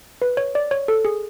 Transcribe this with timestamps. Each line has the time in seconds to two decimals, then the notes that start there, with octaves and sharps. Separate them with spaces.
0.22 B4
0.37 C#5
0.55 D5
0.71 C#5
0.88 A4
1.05 G#4